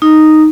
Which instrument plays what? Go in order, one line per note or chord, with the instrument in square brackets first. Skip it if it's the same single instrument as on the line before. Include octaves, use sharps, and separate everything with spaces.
[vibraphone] D#4